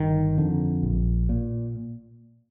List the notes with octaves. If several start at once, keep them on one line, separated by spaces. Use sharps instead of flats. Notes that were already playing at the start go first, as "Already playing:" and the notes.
Already playing: G1 D#3
F2 D3
A#1
A#2